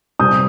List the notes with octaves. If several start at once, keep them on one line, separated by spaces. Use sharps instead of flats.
C3 G3 C4 D#6 G6